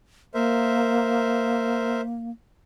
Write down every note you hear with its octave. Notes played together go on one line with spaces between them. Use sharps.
A#3 A#4 C5 E5